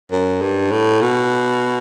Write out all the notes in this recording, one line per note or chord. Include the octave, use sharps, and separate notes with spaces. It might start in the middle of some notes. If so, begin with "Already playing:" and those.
F#2
G2
A2
B2